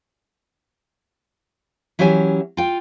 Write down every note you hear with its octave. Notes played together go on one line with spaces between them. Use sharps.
E3 F#3 C#4 G4 E5 G#5
F4 G5